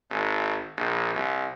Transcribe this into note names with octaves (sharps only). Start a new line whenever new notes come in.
G#1
A#1
C2